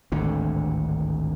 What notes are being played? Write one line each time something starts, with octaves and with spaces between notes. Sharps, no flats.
G#1 D2 A2 D3